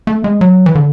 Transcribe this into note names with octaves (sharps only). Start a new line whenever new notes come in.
A3
G#3
F#3
E3
D3